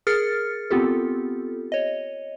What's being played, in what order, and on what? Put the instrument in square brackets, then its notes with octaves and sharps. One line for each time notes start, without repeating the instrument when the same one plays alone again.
[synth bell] G#4 A#4 F6 A6 C#7
B3 C4 F4 G4 A4
C#5 D#5